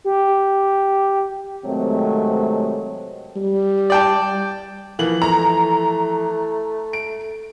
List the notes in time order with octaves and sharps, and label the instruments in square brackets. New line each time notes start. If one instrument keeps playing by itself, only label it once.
[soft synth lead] G4
[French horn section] C3 D#3 F#3 G#3 A3 C4
[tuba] G3
[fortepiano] D5 G5 A5
[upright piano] E3 F3 F#7 [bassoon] A#3
[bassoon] A3 [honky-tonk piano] A#5
[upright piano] D7